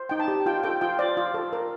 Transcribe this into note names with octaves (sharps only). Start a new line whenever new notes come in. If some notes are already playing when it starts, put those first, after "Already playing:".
Already playing: C5
D#4 G5
A5
G4
F4 G5
A4 G5
F4 G5
C5 D5
F4
A4
A#4